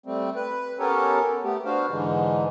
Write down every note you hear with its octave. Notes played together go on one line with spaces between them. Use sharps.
G3 A3 C4
B4
B3 C#4 G4 A4 A#4 C#5
A3 B3 G4
B3 D4 F#4 C5 F5
G#2 D3 E3 G#3